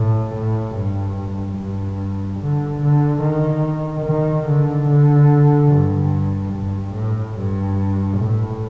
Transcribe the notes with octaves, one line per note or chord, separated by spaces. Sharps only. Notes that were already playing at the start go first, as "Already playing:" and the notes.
Already playing: A2
A2
G2
G2
D3
D3
D#3
D#3
D3
D3
G2
G2
A2
G2
A2